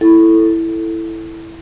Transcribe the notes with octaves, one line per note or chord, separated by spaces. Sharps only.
E4 A4